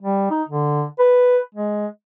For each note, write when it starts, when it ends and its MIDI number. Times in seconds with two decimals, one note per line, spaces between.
0.01 0.26 55
0.30 0.43 63
0.48 0.84 50
0.99 1.38 71
1.55 1.87 56